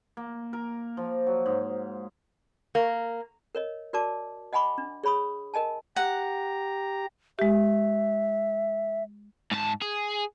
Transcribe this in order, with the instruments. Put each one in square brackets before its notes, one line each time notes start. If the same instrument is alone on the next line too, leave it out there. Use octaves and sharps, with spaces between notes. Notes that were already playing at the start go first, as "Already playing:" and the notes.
[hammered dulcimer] A#3
A#4
F3
F#3
G#2
[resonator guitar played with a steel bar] A#3
[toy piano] A#4 C#5 D#5
F#4 A#4 D5 A5 D6
D#5 F#5 G#5 B5 C#6 D6
D4
G#4 C#5 B5 C#6 D#6
A#4 D#5 G#5 A5
[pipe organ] G4 A#5 [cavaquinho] F#5
[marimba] G#3 G4 [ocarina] E5
[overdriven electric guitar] G#2 A5
G#4